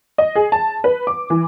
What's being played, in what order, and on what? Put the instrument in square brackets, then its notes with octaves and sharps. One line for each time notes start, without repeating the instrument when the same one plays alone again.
[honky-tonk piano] D#5
G#4
A5
B4
D6
E3